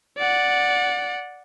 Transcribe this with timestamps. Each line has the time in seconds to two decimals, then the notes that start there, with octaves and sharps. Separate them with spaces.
0.18 D5 F#5